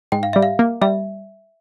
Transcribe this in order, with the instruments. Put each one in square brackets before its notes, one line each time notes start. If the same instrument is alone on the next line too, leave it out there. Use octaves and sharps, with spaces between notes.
[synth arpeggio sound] G#2 [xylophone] G5
[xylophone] F5
[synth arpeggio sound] G3 [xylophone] E5
[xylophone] F5
[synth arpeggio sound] A#3
[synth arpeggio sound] G3 [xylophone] E5